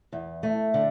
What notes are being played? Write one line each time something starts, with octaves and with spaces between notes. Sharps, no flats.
E2
A3
D3